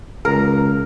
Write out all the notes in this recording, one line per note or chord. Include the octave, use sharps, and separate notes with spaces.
C#2 A#4